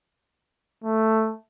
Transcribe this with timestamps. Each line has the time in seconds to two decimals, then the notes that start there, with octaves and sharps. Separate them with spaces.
0.84 A3